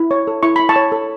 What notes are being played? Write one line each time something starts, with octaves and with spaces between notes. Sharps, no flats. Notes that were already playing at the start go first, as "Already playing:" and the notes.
Already playing: E4
C#5
A4
E4 C#6
E4 B5
A5 C#6
C#5
A4